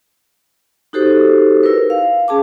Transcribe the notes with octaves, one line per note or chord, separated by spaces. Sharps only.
D#4 F#4 G4 A4 C5
E4 A#4 B4
F5
C#4 G#4 A5 D6